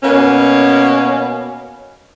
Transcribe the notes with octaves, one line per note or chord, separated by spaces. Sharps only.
B2 A#3 C#4